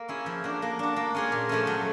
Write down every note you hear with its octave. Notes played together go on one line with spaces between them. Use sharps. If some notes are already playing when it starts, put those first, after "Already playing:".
Already playing: A#3
C#4 E4 G#4
F3
A#3 D4 F#4
A#3
D4 F#4
A#3
C#4 F4 G#4 C#5
A#2
F3 A3 C#4
F#3